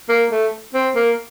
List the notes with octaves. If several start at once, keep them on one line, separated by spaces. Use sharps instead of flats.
A#3
A3
C4
A#3